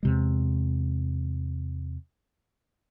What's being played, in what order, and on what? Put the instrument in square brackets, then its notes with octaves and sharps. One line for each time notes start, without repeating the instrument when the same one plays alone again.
[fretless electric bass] E2 C3 G#3